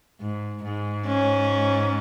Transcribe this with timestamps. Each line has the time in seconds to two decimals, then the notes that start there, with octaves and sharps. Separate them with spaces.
0.20 G#2
0.64 G#2
1.06 C#4